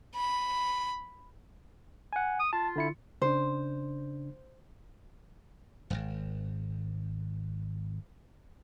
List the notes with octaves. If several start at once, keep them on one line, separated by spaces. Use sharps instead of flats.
B5
F#5 G#5
D#6
F4 A5
D3 E4 C#7
C#3 D4 C5
D#1 G#1